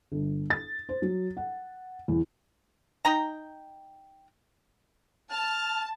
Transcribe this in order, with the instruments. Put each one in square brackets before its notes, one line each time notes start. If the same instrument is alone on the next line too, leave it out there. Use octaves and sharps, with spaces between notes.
[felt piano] G1
A6
C5
F#3
F#5
E2
[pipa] D#4 G5 A#5
[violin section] A5 [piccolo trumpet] F6